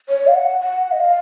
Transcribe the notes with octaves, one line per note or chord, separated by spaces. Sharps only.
C#5
F5
F#5
F#5
D#5
F5